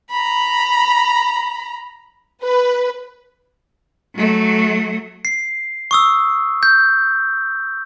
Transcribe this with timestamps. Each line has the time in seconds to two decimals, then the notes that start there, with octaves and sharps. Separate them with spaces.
0.10 A#5 B5
2.42 B4
4.16 F#3 A3
5.25 C7
5.91 C#6 D#6 E6
6.63 G6